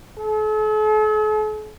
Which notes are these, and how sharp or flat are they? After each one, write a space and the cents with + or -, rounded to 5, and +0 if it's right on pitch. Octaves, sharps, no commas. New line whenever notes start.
A4 -45